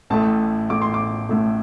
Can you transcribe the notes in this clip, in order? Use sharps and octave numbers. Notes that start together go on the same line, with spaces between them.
A1 A2 A3 A5
A1 A2 A3 D6
C6
D6
A1 A2 A3